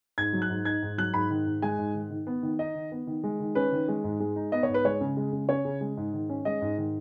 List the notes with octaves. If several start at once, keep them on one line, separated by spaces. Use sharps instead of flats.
G#2 G#6
F#3
F#6
G#2
D#4 G#6
G#2
F#3 F#6
G#2 B5
D#3
G#2
G#3 G#5
G#2
D#3
D#3
B3
D#3
D#4 D#5
D#3
B3
D#3
G#3
D#3
C#4 B4
D#3
G#3
G#2
G#3
D#4
B3 D#5
C#5
G#2
B4
G#3 C#5
C#3
G#3
C#3
C#4 C#5
C#3
G#3
G#2
D#3
C#4
G#3 D#5
G#2
D#3